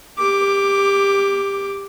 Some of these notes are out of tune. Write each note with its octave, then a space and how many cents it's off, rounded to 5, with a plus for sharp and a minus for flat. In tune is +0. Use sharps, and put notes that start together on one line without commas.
G4 +20 D6 +0